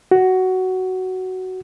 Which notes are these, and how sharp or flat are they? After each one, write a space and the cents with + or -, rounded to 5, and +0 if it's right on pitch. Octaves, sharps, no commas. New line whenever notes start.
F#4 +10